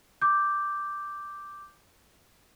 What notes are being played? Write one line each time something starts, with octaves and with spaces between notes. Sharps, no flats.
D6 G6